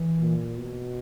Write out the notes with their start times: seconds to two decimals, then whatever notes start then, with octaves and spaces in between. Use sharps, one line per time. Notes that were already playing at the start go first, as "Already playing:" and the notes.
Already playing: E3
0.19 A#2
0.59 B2